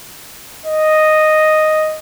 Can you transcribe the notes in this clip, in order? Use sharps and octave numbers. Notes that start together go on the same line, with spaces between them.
D#5